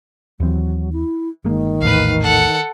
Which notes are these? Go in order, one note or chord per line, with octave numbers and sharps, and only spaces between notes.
D#2 E3 F#3 C4
E4
G1 D#3 G#3 A#3
A#1 E2 A2 B4 F5
A4 F#5